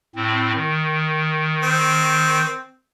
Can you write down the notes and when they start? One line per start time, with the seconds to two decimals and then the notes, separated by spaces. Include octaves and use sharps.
0.15 A2 C4
0.56 D#3
1.63 C4